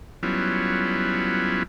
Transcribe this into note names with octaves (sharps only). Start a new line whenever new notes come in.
F#3 G3 B3 C#4 E4 F4